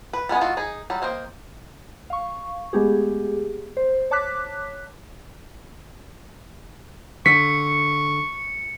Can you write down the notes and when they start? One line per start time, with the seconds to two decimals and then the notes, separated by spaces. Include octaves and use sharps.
0.13 B4
0.29 G3 G#3 B3 C#4
0.41 A3 D#4 F4 F#4
0.57 D#4 G#4
0.90 F#3 G3
1.02 A#3 C5 D#5 G5
2.10 F5 C#6
2.73 G#3 A3 B3 G4 G#4
3.77 C5
4.11 C#5 A5 D6 F#6 B6
7.26 D3 C#6 B6 C#7